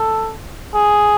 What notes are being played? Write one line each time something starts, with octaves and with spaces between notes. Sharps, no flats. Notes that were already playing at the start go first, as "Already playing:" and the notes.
Already playing: A4
G#4